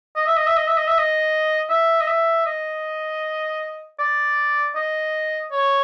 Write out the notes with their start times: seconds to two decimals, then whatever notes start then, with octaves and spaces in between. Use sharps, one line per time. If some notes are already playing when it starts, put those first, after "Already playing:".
0.16 D#5
0.27 E5
0.37 D#5
0.47 E5
0.57 D#5
0.68 E5
0.77 D#5
0.88 E5
0.98 D#5
1.70 E5
2.01 D#5
2.08 E5
2.46 D#5
3.99 D5
4.75 D#5
5.52 C#5